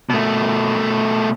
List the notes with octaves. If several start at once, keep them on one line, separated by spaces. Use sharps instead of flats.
B2 A3